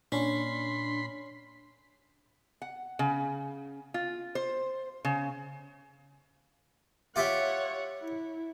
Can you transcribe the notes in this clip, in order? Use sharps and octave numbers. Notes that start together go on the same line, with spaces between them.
A#2 C#4 D4 B5 C6
F#5
C#3
F4
C5
C#3
F4 G4 C#5 E5 F#5
E4